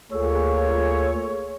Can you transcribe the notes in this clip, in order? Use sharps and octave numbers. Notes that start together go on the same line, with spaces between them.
D2 A#3 F4 G#4 A4 C#5